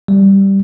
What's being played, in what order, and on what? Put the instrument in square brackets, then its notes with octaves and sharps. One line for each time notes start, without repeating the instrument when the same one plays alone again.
[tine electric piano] G3